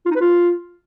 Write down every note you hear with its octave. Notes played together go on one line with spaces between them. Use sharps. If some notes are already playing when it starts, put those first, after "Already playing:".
F4
D#4
B4
F4